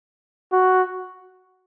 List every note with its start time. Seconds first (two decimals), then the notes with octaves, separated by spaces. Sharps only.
0.52 F#4